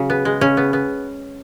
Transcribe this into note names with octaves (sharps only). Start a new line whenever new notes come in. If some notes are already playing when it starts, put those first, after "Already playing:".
Already playing: C#3 F#3
B3
G#3
C#3 C#4
B3
B3